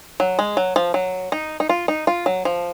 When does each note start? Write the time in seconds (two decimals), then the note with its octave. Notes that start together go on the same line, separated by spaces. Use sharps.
0.20 F#3
0.39 G#3
0.57 F#3
0.76 F3
0.94 F#3
1.32 D#4
1.60 D#4
1.69 F4
1.88 D#4
2.07 F4
2.26 F#3
2.45 F3